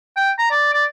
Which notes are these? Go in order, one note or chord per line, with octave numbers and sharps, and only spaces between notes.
G5
A#5
D5
D5